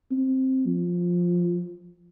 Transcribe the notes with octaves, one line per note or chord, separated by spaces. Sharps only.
C4
F3